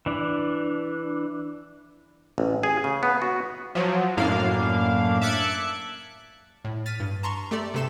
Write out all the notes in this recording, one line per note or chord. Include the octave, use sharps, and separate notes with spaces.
E3 D4
A1
G#4
C#3
B3
F#4
F3 F#3
F#2 A2 A#3 D4 F5
E5 A5 D6 F#6 G#6 C#7
A2
F6 A6 B6 D#7
G2
A5 A#5 C6 C#6
A3 G4 A4 D5
G2 C3 A3 A4 C6 E7